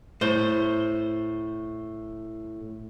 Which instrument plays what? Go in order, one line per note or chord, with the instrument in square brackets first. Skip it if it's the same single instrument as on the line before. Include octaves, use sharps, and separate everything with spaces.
[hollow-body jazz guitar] A2 C5